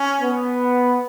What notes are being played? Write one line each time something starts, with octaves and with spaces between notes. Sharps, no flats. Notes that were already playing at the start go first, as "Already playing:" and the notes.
Already playing: C#4
B3